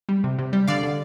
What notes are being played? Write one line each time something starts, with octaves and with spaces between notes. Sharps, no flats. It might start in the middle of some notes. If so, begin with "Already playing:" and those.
G3
C3
C3
G3
D3 D5 F5
D3